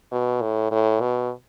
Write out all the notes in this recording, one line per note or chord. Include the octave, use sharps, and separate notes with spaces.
B2
A2
A2
B2